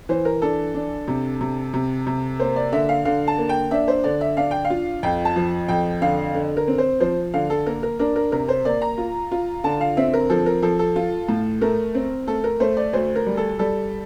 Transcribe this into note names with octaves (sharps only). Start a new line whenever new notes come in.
E3 C5
A#4
D4 A4
D4
C3
C3
C3
C3
A#3 C5
D5
D3 E5
F5
D3 F5
A5
A#3
G5
D4 E5
C5
D3 D5
E5
D4 F5
G5
F5
F4
F2 G5
A5
F3
F2 G5
D3 F5
D3
A#4
C4
C5
F3 C5
D3 F5
A4
A#3 A#4
A#4
D4 A#4
A#4
C3 A#4
C5
A#3 D5
A#5
F4
F4
D3 A5
F5
C4 E5
A#4
F3 A4
A#4
F3 A4
A4
F4
A2
A3 A#4
C4
A3 A4
A#4
A3 C5
D5
D2 C5
A#4
G3
A4
G3 A4